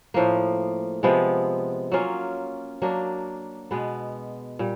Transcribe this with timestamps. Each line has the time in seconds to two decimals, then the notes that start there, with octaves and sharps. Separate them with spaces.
0.14 A2 F3 A#3
1.03 C3 F3 G#3 B3
1.92 F#3 A#3 C#4 F4
2.82 F#3 A#3 D4
3.71 B2 G#3 B3
4.59 A#2 G3